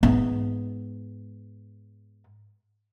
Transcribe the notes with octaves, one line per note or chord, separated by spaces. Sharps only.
G#2 B3